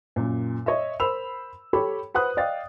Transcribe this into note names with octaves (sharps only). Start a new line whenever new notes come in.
F#2 A#2
C#5 D#5 E5
A#4 C5 B5 E6 F7
G4 A4 C#5 B5
B4 C5 F#5 B5 D#6 F#6
D5 D#5 F5 G5 A6